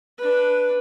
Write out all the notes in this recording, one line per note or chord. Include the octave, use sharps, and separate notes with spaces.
D4 B4